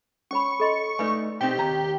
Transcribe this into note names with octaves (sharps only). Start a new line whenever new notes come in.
C#4 C#5 B5 C#6
A4 D#5 C6
A3 D#4 B4 D5 G#5
B2 C4 D#4 G4
D#2 A#5